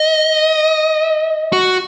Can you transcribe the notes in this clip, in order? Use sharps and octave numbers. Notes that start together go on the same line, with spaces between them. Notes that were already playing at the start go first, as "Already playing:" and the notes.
Already playing: D#5
F#4